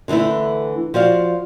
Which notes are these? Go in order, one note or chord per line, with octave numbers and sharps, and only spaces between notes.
D3 E3 G#3 A3 E4
F3 F#4 D5 F5